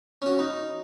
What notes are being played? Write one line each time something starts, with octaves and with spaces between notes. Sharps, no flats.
C#4 F#4
D#4